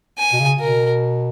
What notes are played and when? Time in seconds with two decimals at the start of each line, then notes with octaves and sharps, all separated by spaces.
0.18 G#5
0.33 B2
0.40 C#3
0.60 B2 A#4